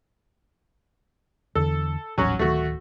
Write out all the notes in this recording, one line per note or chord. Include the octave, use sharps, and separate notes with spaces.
E2 D3 A4
D#1 A1 F#3 C#4 F#4
D1 D#3 A3 F#4